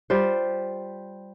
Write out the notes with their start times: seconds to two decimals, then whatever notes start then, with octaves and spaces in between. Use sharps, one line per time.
0.10 G3 F4 C5